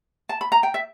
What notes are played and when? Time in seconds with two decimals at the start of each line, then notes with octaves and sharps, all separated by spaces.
0.29 A5
0.41 B5
0.52 A#5
0.63 G5
0.74 E5